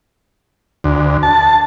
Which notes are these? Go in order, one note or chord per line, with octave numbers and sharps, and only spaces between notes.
D2
A5